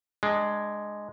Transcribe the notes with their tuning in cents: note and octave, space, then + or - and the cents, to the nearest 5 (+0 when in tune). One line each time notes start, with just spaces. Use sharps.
G#3 +0 D4 +20